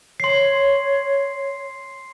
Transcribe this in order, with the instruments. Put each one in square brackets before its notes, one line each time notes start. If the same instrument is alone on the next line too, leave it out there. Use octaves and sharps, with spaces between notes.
[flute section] C#5 [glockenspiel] C6 C7